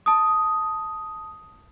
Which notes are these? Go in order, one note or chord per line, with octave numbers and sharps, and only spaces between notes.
A5 D#6